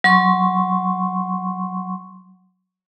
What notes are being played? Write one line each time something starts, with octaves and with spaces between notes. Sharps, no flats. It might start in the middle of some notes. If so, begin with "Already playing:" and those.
F#3 C6 C#6